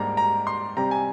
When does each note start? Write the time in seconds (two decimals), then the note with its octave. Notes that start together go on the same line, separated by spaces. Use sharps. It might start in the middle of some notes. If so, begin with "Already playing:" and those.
Already playing: G#2 G3 A#3 D4 A#5
0.17 A#5
0.47 C6
0.77 C3 G3 C4 A#5
0.91 G#5